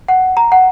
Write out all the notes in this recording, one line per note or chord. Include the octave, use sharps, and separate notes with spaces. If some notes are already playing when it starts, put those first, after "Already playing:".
F#5
A#5
F#5